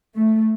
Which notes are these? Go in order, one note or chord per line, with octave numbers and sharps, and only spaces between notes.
A3